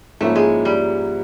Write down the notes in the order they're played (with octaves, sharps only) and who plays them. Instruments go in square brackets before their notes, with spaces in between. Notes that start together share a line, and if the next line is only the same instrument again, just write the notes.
[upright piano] G#2 F3 A#3 C#4 E4 [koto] A3
[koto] G#3
G3